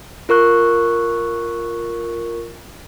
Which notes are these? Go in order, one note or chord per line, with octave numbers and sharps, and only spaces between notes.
F4 A#4 C#6 F#6